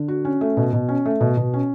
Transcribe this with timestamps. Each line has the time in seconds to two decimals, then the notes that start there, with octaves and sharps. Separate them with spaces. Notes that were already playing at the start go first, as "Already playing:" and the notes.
Already playing: D3
0.08 F#4
0.25 C#4
0.41 A3
0.57 B2
0.73 B2
0.89 C#4
1.05 A3
1.21 B2
1.37 B2
1.54 C#4